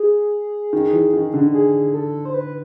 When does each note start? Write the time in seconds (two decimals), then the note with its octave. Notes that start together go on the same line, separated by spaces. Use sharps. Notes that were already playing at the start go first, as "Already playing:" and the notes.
Already playing: G#4
0.73 D#3
0.93 E3
1.13 D#3
1.34 D3
1.54 G#4
1.94 A4
2.25 C5
2.34 B4